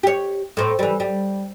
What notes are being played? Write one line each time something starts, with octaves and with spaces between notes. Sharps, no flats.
G4 C#5
A2 C4
E3 G3
G3